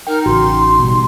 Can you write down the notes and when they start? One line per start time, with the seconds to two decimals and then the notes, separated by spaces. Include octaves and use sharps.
0.07 D#4 A#4 G5
0.26 A1 C#3 F#4 C6
0.79 B2 G3